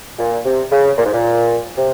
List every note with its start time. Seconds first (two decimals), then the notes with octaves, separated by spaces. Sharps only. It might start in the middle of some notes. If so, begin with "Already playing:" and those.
0.18 A#2
0.44 C3
0.71 C#3
0.97 A#2
1.05 G#2
1.13 A#2
1.77 C3